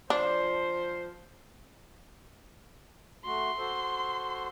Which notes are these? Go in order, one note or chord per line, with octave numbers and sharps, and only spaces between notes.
F3 D4 C5
A3 F#4 C6
F#4 A4 C5